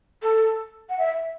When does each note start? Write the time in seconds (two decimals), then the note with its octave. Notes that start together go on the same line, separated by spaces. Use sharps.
0.22 A4
0.89 F#5
0.99 E5